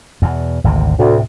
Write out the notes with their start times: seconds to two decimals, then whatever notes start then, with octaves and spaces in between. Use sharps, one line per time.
0.22 E2 B2
0.64 G#1 D2 C3
0.99 D2 A2 C3